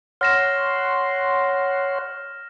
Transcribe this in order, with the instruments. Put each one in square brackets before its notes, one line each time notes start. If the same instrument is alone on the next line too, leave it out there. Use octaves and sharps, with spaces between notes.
[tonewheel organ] C#5 F#5 C6 [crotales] F6 A#6 E7